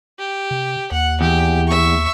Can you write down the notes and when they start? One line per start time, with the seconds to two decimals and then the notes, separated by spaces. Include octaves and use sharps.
0.19 G4
0.51 C3
0.91 D#2 F#5
1.21 E2 G4
1.68 E5 C#6